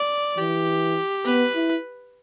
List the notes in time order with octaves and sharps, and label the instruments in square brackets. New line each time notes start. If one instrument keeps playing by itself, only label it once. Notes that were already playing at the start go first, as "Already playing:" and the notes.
Already playing: [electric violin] D5
[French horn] E3 [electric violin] G4
[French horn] B3 [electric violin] B4
[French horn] E4